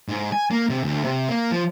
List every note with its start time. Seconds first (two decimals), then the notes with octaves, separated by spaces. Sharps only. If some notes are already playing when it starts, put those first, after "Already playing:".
0.08 G#2
0.32 G#5
0.51 A#3
0.70 C3
0.84 D2
1.04 C3
1.28 A#3
1.52 F3